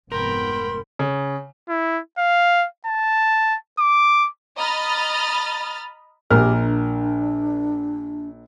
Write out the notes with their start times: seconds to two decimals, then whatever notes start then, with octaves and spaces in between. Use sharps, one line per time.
0.12 F1 G#2 B3 A#4 G5 B5 C6
0.99 C#3
1.69 E4
2.19 F5
2.86 A5
3.79 D6
4.58 D#5 A#5 B5 F6 A6
6.30 A#1 G4 A#4 F6
6.62 D4